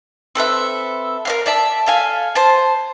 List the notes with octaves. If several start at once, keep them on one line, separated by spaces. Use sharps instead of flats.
C4 A4 B4 E5
A#4 D5 F5
D5 E5 A5
A4 F5 G#5
C5 A5